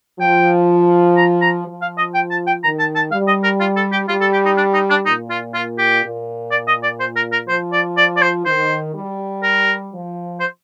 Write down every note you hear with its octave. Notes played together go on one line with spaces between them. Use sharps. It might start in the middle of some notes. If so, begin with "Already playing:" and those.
F3 G5
A#5
A#5
F3
F5
D#5
G5
A5
G5
D#3 A#5
A5
A5
G3 F5
D#5
A#4
F4
A4
G4
G3 F4
A4
G4
D#4
D4
D#4
D4
A#2 D#4
F4
F4
G4
A#2
D5
D#5
D5
C5
A#4
A#4
F3 C5
D5
D5
D5
C5
D#3 C5
G3
A#4
F3
C5